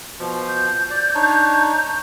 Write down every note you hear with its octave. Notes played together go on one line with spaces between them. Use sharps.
B2 F3
G6
D5
D4 D#4 C#5